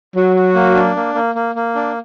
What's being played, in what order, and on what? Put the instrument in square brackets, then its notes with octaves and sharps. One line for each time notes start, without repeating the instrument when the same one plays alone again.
[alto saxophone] F#3 [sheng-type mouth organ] F#4
[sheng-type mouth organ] F#4
A#3
D4
A#3
A#3
A#3
A#3
D4